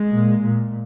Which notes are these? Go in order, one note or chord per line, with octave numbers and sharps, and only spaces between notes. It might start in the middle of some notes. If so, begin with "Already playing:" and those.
Already playing: G#3
A#2
A#2